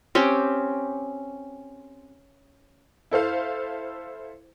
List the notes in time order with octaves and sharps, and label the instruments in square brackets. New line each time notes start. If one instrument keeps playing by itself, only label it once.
[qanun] C4 C#4 G4
[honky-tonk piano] E4 A4 C5 F5